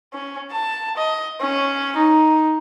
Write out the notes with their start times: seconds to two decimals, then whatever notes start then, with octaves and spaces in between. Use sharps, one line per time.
0.13 C#4
0.51 A5
0.97 D#5
1.41 C#4
1.96 D#4